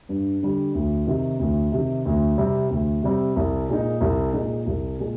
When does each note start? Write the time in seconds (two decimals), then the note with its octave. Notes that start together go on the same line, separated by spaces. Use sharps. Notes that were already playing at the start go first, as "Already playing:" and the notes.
0.09 G2
0.42 D3 G3
0.74 D2
1.07 C3 D#3
1.39 D2
1.72 C3
1.77 D#3
2.05 D2
2.38 C3 G3 C4
2.70 D2
3.02 C3 G3 C4
3.36 C2
3.69 A#2 G#3 D#4
4.01 C2
4.33 A#2 G#3 D#4
4.66 C2
4.99 A#2 G#3